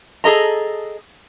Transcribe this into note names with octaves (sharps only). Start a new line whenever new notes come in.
G#4 A4 D#5 A#5